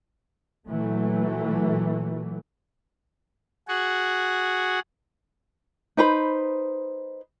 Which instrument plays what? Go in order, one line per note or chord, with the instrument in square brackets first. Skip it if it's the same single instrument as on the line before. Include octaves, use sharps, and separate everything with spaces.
[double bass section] A#2 E3 F#3 A3
[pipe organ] F#4 G#4 F#5
[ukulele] D#4 B4 C5 B5